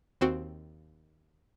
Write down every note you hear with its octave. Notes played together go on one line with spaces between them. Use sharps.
D#2 C4 F#4